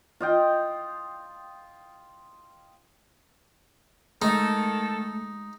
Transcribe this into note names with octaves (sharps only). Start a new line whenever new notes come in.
F4 D#5 G5
D#3 G#3 A3 D#4 A4